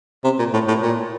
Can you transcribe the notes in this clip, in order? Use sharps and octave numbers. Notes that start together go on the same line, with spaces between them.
C3
A#2
A2
A2
A#2